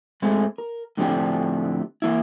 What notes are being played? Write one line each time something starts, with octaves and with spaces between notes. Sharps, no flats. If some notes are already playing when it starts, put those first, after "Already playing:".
G#2 G#3 A3 C4
A#4
A2 D3 F3 C4 D4 G4
E3 A#3 E4